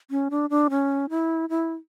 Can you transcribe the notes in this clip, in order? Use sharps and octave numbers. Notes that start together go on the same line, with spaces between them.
C#4
D4
D4
C#4
E4
E4